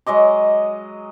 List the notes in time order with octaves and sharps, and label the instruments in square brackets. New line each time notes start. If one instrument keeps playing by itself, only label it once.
[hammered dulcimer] F#3 G#3 D#5 D6